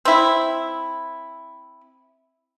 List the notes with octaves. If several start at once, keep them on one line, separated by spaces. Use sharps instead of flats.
C4 E4